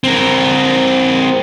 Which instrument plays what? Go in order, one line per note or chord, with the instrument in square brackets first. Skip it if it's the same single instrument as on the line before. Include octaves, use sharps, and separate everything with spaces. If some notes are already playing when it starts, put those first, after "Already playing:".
[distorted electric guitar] C4 A#4